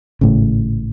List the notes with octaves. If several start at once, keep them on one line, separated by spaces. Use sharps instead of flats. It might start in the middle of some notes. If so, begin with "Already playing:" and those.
G#1 A2 C#3